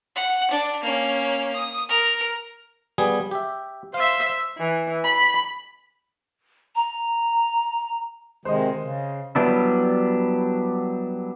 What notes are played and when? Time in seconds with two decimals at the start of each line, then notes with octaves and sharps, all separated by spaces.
0.16 F#5
0.51 D4
0.82 A#3 C#4
1.55 D#6
1.89 A#4
2.98 G3 B3 G#4
3.31 G4 E5
3.94 C5 E5 F5
4.57 E3
5.04 B5
6.75 A#5
8.45 C3 D#3 G#3 C5 D#5
8.82 C#3
9.35 F#3 G3 B3 D4 E4